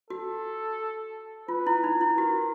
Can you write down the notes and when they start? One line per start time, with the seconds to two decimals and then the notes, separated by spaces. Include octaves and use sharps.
0.10 F#4 A4
1.48 F4 B4
1.67 E4
1.84 D#4
2.01 E4
2.18 F#4 A#4